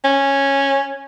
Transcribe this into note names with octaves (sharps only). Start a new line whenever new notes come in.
C#4